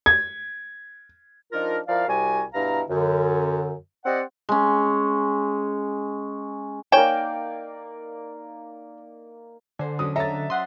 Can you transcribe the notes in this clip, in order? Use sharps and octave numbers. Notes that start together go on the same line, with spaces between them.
G#6
F3 D4 D#4 F4 A#4
F3 E4 A#4 D5 F5
C2 C3 G3 F#4 G#5
G2 B2 E4 F5 A#5
F#2 D3
C4 G4 C5 D5 D#5 F#5
G#3 C#4
A#3 D#4 C#5 D5 G5 G#5 E7
D3 C5 G#5
F#3 C#4 D#6
C#5 D#5 E5 A#5 A6
F#5 A#5 C6 D#6